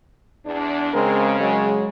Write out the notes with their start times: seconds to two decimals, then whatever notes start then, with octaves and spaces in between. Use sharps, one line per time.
0.46 E2 D4
0.94 C#3 G#3 C4 A#4
1.40 F#3 G#3